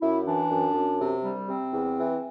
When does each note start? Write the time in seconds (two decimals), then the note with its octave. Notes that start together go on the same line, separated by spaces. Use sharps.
0.01 F#2 E4
0.25 E3 D4
0.50 F#2
0.74 F#2
0.99 C3
1.23 G3
1.49 C3 C4
1.73 E2
1.98 E3